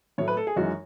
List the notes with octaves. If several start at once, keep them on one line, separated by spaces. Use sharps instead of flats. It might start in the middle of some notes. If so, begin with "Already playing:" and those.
A2 F#3 A3 C#5
B4
A4
G#4
F#2 E3 G#3 D#4 F#4